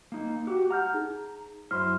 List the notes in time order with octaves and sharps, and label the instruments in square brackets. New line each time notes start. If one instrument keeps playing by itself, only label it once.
[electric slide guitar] A#3 D#4
F#4 G4
[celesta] F#5 F6 G6 [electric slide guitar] A#5
[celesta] D#4 G#4
[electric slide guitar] F#2 E4 C5 [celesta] C6 F6